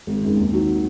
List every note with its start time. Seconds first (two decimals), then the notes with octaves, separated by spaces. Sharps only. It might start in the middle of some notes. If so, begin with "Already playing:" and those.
0.07 G#1
0.22 F#2 D#3 G#3
0.37 D#2
0.52 D#3 F#3